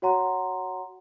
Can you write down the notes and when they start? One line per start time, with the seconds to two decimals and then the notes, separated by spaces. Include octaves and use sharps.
0.02 F#4 C#5 F#5 A#5 C6